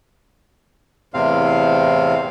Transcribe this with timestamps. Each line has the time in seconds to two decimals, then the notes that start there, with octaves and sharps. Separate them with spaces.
1.14 E2 A2 C3 C4 F5